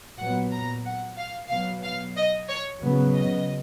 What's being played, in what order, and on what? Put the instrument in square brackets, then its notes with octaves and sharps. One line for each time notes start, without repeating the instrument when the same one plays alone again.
[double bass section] A#2 F#3 B3 [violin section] F#5
[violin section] A#5
F#5
F5
[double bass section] B2 F#3 B3 [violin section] F5
[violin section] F5
D#5
C#5
[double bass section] C#3 F#3 B3
[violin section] D#5